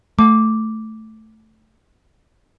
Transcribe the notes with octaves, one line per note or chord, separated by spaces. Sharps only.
A3 D6